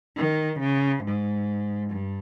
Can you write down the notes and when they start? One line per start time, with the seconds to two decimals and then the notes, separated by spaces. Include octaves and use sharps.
0.17 D#3
0.60 C#3
1.04 G#2
1.90 G2